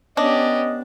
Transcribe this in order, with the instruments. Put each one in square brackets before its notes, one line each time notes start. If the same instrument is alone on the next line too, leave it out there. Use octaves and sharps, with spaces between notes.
[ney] B3 [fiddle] C#4 G4 [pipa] D4 [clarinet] D#5